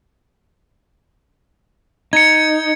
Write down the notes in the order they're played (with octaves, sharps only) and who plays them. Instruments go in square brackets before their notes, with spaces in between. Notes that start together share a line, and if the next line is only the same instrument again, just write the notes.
[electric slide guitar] D#4 [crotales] G#6 C#7